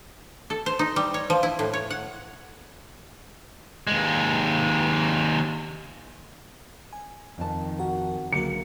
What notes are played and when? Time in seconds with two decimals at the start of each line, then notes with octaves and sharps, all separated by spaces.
0.50 A4
0.66 C5
0.79 D#4
0.96 G3
1.14 C#5
1.30 F3
1.43 E4
1.59 A2
1.73 C#5
1.90 F#5
3.87 D#2 G#3
6.93 G#5
7.38 F2 D#3 A5
7.79 F#4 A#4
8.33 C#2 D3 F#3 A#3 F#4 C#7